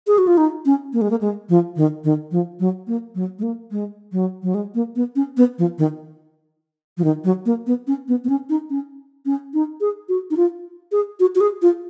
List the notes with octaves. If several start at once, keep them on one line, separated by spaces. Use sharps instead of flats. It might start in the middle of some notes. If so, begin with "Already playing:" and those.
G#4
F#4
F4
D#4
C#4
A#3
G#3
A#3
G#3
F3
D#3
D#3
F3
F#3
A#3
F#3
G#3
A#3
G#3
F#3
F#3
G#3
A#3
B3
C#4
B3
F3
D#3
F3
D#3
F#3
A#3
B3
C#4
B3
B3
C#4
D#4
C#4
C#4
D#4
G#4
F#4
D#4
F4
G#4
F#4
F#4
G#4
F4